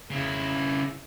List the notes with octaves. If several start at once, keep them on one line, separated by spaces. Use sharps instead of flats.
C#3 E4